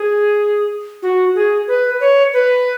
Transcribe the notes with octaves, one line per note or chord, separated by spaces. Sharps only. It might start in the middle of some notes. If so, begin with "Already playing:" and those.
Already playing: G#4
F#4
G#4
B4
C#5
B4